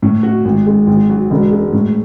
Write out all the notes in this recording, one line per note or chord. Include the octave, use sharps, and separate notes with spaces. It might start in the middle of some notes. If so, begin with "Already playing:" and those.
A2
F#4
G#1
G#3
G#1
F#3
E1
G#3
A2